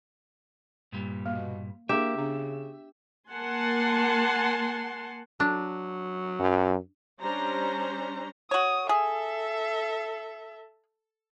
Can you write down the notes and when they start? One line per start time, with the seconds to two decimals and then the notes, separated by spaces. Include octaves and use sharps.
0.92 G2 A#2 G3
1.26 B2 A#3
1.89 A#3 D4 G4 G#4 E5
2.17 C#3 B3 D4
3.31 A#3 F#5 G#5 A5 C6
5.40 F#3 D4
6.40 F#2
7.20 G3 C#4 D4 C5 A#5
8.51 F#4 C#5 D#6
8.89 G#4 A4 E5